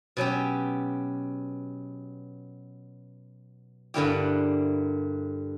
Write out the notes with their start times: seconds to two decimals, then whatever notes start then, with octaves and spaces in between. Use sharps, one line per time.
0.17 B2 F#3 C#4 G4
3.94 G2 D3 A#3 E4 G4